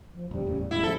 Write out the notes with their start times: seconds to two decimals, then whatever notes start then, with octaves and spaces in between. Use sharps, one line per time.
0.14 F3
0.31 D#1 D#2 C#3 G3
0.46 E2 A2 C#3
0.71 G#3 E4
0.83 F3 A4